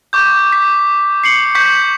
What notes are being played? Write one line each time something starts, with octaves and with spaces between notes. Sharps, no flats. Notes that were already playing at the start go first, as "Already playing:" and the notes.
C#6 D6 G6
B6
C7 C#7 F#7
C#6 G6 B6